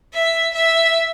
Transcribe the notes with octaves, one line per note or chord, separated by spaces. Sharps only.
E5
E5